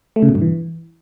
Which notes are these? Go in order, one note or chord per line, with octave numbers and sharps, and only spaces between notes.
A3
C#3
B2
G2
E3